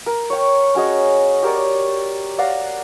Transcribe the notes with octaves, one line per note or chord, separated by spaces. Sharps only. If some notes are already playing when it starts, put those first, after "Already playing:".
A#4
C#5 G5
C#4 F#4 G#4 D#5
G4 A#4 C#5 D5
D5 F5 F#5 A#5